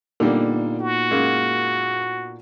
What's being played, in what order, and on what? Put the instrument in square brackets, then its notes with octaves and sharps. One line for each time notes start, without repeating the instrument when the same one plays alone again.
[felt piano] A#2 B3 D#4 [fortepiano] D3 G3 A#3
[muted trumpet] F#4
[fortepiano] F#2 G#3 A#3